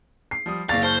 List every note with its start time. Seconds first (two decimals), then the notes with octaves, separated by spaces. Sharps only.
0.31 C7
0.46 F3 G3 D#6
0.69 F#1 D5 F5 C#6 A6 A#6
0.83 C5 A5 C#6 F6